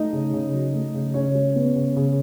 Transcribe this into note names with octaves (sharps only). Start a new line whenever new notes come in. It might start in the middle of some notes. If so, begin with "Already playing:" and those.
Already playing: A3 D#4 D#5
C#3
C#3
F#3
A3
C#3
C#3 C#4 C#5
G#3
B3
C#3
C#3